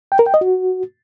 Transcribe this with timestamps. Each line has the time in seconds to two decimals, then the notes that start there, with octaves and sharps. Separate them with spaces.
0.12 G5
0.19 A#4
0.26 G5
0.34 D#5
0.41 F#4